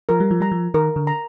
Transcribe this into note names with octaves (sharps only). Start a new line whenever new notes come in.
F3 A#4
G3
F3
G3 A#5
F3
D#3 A#4
D3
A#5